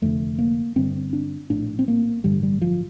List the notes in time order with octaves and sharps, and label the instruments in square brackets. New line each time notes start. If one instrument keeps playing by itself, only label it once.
[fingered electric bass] F1 F2 D3 A3
A#3
G1 G2 D3 C4
D4
A#1 A2 D4
C4
A#3
A1 G2 D3 G3
G3
F3